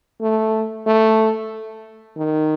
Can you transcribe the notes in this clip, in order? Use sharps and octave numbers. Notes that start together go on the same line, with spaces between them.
A3
A3
D#3